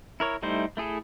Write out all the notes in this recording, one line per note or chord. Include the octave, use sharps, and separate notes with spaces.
E4 A#4 C#5
G3 A3 D#4 E4 C5
A3 E4 G#4 A4